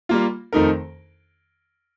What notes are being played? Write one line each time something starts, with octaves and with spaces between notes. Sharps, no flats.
G3 A#3 F4
F2 D#3 A3 D#4 A#4